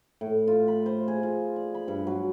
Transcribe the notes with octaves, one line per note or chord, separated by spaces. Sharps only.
A2
F4
B5
C5
G#4
F4
D5
B5
G2
F#3